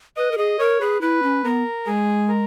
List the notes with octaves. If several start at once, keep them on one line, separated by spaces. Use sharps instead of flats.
B4 D#5
A#4
G#4 D#5
A#4 C#5
G#4 B4
E4 B4
C#4
B3 A#4
G#3 G#4
A#4